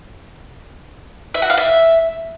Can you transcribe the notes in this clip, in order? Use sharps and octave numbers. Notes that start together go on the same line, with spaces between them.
E5
F#4
F5
E5